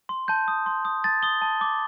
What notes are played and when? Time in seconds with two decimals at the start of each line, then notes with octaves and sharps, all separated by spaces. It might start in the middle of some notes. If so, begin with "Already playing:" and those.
0.09 C6
0.28 A5 G6
0.48 D#6
0.66 C6
0.85 D#6
1.04 A5 A6
1.23 D#6 G7
1.42 A5
1.61 D6